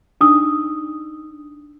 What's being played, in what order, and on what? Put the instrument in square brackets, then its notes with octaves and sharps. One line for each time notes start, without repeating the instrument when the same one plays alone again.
[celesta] D4 D#4 D#6 E6